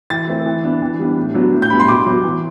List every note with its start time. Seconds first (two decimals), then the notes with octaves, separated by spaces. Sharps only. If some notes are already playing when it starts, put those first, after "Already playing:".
0.10 E3 A6
0.27 A3 C4
0.46 E3
0.63 B3 D4
0.82 E3
0.99 G3 B3 D4
1.18 A2
1.34 F#3 B3 D4
1.52 A2
1.62 G6
1.70 G3 B3 D4 B5
1.80 C6
1.88 B2 D6
2.06 F#3 B3
2.24 E3